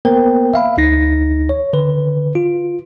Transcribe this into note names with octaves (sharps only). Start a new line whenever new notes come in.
A#3 B3 A#4 C5 G5
E5 F5 B5
D2 D#4 A#6
C#5
D3 B4
F4